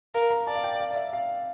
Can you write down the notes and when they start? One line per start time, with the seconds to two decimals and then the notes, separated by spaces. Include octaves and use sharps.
0.14 A#4 F5
0.30 A#5
0.47 D5 A5
0.55 F5
0.63 G5
0.80 F5
0.91 D5
0.96 E5
1.13 F5